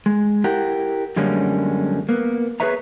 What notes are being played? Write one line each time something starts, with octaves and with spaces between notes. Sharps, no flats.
G#3
E4 G4 A#4 F#5
F#2 D3 G3 G#3 A#3 C#4
A#3 B3
G#4 A4 B4 C#5 E5 A#5